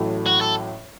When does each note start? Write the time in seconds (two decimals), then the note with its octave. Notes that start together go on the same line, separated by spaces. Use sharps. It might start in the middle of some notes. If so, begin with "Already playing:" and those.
Already playing: A1 A2 F#3 A3
0.26 F#4
0.41 A4